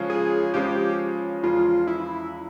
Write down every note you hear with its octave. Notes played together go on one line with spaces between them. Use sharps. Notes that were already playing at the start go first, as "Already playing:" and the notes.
Already playing: C#3 F3 G#3 C#4
G#4
C#3 F3 G#3 C#4 G4
E2 C#3 F3 G#3 F4
E4